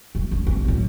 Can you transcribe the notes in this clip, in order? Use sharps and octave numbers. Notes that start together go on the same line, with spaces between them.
D#1
C#3
D2 C4
A2 F#3